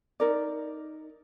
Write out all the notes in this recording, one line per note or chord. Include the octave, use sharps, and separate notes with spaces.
D#4 A#4 D5